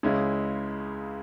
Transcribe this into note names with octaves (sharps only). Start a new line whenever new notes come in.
C#2 C#3 G#3 C#4 E4